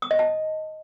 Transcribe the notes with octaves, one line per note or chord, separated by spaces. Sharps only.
D#6
D#5
A5